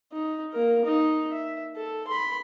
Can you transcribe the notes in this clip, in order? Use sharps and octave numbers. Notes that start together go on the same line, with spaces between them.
D#4
A#3 A#4
D#4
E5
A4
B5 C6